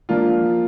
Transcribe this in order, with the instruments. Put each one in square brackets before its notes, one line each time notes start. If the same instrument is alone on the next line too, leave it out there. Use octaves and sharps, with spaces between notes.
[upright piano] F3 A#3 D4 F4